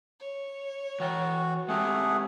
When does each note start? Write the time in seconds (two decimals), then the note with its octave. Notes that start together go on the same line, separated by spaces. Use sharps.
0.20 C#5
1.00 E3 F#4 G5
1.68 G#3 A3 C4 G4 G#4 F#5